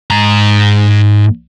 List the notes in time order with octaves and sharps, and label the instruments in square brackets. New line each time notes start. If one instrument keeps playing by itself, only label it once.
[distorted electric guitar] G#2 A#5